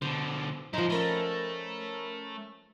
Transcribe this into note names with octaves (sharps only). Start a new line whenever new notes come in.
B2 D3 C5
F3 D#4 E4 C5
A3 C#4 A#4 B5